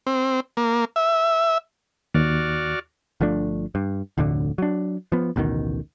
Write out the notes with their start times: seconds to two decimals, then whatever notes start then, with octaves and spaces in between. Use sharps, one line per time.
0.07 C4
0.57 A#3
0.96 E5
2.15 D#2 F#4 D5 F6
3.21 G1 F3 A3 D4
3.75 G2
4.18 F1 D2 A2 D3
4.58 F#3 D4
5.12 F3 B3
5.36 A1 D2 B2 D#3